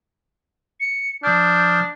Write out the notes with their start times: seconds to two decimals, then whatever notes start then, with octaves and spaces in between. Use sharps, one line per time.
0.80 C#7
1.23 F3 D4 D#6 F6 G6